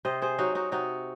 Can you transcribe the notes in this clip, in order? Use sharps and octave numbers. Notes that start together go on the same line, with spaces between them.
C3 C5 D#5
G#4 C5
F#3 D#4 F#4
D#4 F#4
C3 D#4 F#4